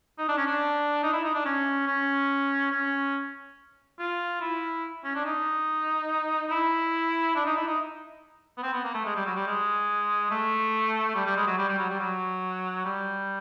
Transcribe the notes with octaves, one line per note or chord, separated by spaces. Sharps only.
D#4
D4
C#4
D4
D#4
E4
D#4
D4
C#4
C#4
C#4
F4
E4
C#4
D4
D#4
D#4
E4
D4
D#4
E4
D#4
B3
C4
B3
A#3
A3
G#3
G3
F#3
G3
G#3
A3
G3
G3
G#3
F#3
G3
G3
F#3
G3
F#3
G3